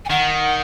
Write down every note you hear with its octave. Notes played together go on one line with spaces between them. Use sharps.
G#5
D#3 F#5